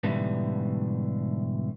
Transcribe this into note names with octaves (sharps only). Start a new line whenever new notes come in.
G#2 B2 D3 E3 G3 A3